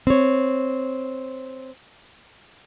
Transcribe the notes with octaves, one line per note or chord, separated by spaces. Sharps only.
C4 C#5